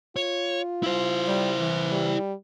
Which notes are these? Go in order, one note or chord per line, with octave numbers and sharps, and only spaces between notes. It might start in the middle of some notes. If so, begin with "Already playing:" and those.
F4 C#5
E4 C5
G3
E3
G3